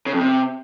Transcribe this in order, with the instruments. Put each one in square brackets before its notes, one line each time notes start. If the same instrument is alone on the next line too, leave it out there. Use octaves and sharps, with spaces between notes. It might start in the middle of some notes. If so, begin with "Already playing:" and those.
[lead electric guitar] C#3
F2
C3